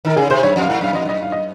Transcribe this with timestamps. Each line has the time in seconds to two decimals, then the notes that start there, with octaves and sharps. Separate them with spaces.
0.05 D#3 A#4
0.16 C#3 G#4
0.30 C3 C5
0.43 F#2 C#5
0.56 F2
0.61 F5
0.69 G#2 F#5
0.81 F#2 F5
0.93 F2 D#5
1.05 F#2 D#5
1.22 F5
1.32 D#5